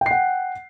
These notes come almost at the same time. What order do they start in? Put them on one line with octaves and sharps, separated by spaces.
G5 C7 F#5